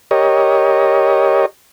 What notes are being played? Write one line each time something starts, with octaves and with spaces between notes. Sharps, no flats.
G4 A#4 C#5 D#5